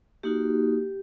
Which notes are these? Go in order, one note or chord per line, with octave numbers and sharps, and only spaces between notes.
A#3 D#4 F#4 G4